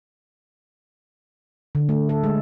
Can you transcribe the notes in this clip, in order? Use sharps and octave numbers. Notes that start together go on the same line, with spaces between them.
D3
A3
A4
G#3